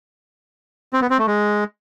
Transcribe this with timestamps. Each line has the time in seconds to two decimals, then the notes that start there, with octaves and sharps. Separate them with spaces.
0.93 C4
1.02 B3
1.10 C4
1.19 A3
1.27 G#3